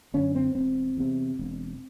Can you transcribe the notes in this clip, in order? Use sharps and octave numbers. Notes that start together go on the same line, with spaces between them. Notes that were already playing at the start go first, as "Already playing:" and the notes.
F#2 D3 C#4
C4
E1 C4
E2 C3
E1